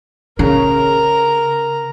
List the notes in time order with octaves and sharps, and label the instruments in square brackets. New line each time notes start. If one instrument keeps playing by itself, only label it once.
[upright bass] C#3 [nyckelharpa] A#4 A#5